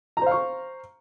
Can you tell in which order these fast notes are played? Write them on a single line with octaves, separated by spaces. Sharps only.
A#5 C5 F5 C#6